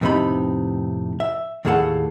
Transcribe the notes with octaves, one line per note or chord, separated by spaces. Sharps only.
F2 A2 C3 B3 D#4 B5
E5
D#2 A2 A#3 G#4 A4 F#5